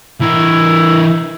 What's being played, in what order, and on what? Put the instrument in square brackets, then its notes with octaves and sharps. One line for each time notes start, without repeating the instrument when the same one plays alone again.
[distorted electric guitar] E3 A#4 [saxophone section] E4